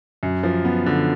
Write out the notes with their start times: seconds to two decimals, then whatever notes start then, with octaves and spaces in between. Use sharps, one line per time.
0.23 F#2
0.43 F3
0.65 B3
0.86 D3